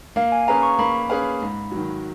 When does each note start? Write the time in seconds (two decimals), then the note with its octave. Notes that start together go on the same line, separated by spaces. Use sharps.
0.16 A#3 F5
0.32 G#5
0.48 C#4 G#4 B4 F5 A#5
0.63 C#6
0.79 A#3 B5
1.10 C#4 G#4 B4 F5
1.42 G#2
1.72 D#3 F#3